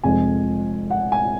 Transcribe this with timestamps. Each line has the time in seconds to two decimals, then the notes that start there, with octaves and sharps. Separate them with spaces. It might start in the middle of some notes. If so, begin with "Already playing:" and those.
0.03 F1 F2 F3 G#3 G#5
0.90 F#5
1.12 G#5